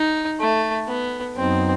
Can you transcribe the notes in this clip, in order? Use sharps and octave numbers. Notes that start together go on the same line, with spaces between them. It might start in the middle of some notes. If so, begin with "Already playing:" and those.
Already playing: D#4
A3
B3
F#2 F#3 B3 C4 D#4